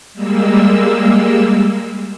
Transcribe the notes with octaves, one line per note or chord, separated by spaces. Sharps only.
G3 G#3 A#3 E6